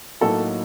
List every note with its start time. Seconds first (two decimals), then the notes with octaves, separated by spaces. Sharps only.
0.21 A2 F#3 A#3 D#4 F#4 A4